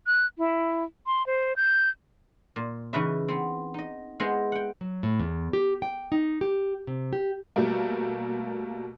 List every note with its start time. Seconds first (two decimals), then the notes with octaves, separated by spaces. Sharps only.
0.07 F#6
0.38 E4
1.07 C6
1.27 C5
1.57 G6
2.56 A#2
2.93 C#3 E3 D#4 B4 D#5 E5
3.28 B3 C4
3.74 D#4 D#5
4.20 G#3 B3 E4 C5 D#5
4.52 F#5 G5
4.81 F#3
5.03 A2
5.19 E2
5.53 G4
5.82 G5
6.12 D#4
6.41 G4
6.87 C3
7.13 G4
7.56 B2 G3 A3 A#3